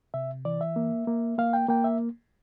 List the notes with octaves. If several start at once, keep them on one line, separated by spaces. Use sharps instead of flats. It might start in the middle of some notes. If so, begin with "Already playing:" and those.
C3 E5
E3 D5
E5
A#3
A#3
A#3 F5
G5
A#3 G5
E5